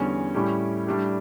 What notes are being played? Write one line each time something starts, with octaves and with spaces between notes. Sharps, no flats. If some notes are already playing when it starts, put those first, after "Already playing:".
Already playing: E2 D3 G3 C#4
A2 G3 C#4 E4 G4
A2 G3 D4 G4